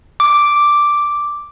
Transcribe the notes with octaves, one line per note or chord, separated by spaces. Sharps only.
D6